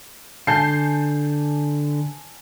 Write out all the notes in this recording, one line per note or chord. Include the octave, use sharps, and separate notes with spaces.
D3 G#5 A5 G6 C7